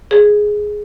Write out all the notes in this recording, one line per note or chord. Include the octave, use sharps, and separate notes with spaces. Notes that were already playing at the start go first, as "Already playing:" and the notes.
G#4